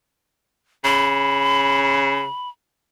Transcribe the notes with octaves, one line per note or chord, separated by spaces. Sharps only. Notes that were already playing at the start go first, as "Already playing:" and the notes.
C#3 B5